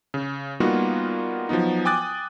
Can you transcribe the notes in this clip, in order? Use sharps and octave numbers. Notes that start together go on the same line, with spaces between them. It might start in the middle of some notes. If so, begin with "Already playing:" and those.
C#3
G3 A#3 B3 D#4 F4 F#4
F3 F#3 B3 D#4
G5 G#5 D6 D#6 F#6 A6